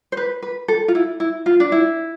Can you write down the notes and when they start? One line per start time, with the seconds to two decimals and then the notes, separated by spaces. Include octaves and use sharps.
0.12 C5
0.17 B4
0.42 B4
0.68 A4
0.88 F4
0.95 E4
1.20 E4
1.46 F4
1.60 D4
1.72 E4